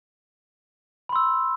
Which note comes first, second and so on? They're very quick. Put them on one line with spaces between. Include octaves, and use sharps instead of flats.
B5 C6 E6